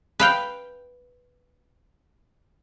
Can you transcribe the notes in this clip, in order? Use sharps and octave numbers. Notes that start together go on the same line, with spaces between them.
B4 F5 G5